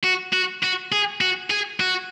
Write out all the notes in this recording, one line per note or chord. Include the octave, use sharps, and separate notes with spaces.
F#4
F#4
F#4
G#4
F#4
G#4
F#4